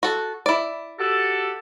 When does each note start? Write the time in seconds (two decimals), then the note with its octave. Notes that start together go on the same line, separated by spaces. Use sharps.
0.03 F#4 A4
0.46 E4 D5
0.99 F#4 G4 A4